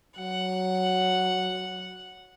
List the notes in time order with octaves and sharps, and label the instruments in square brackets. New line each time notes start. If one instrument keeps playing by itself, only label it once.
[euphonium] F#3 [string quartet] F#5